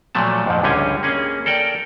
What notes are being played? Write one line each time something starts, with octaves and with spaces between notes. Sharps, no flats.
A#2 F3 F#3 A3 A5
F2 G#2 F3
C#2 D3 G3 C#4 F5 G#5
A#3 C#4 G#4
A4 A#4 D5 G5